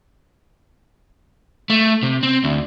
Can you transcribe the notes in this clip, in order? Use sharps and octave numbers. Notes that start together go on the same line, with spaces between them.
A3
C3
C4
D2